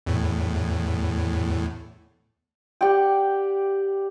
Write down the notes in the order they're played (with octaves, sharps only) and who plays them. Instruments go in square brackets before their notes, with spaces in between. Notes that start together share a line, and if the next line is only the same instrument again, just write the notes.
[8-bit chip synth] E2 A2
[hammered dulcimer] G4 D5 F#5 G5